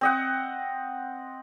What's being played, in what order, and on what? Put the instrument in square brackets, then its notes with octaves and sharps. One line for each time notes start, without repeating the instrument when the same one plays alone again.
[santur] C4 D#5 F#5